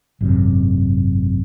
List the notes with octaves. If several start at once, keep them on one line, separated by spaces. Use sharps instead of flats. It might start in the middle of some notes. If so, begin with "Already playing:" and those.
G#1 F#2 C3